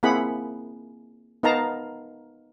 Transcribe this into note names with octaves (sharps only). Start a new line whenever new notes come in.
A#3 C4 E4 G#4 F#5 B5
B3 D#4 A#4 F5 A5 A#5